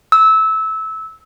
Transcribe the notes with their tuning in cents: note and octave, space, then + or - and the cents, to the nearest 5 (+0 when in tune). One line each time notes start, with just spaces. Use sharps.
E6 -20